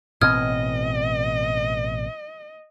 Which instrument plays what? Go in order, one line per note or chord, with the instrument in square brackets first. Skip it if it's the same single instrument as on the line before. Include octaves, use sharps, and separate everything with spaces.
[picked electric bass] A1 B2 C4 [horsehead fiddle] D#5 [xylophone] D#6 F6 G#6